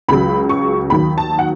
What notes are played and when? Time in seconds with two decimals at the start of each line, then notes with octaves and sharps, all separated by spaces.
0.08 C#2 C#3 F#3 B5
0.49 C#6
0.90 D#2 D#3 F#3 B5
1.18 A5
1.39 F#5